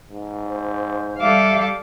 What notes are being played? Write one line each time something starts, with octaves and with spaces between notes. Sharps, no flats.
G#2
C5
G3 G4 A4 E5 F5 D6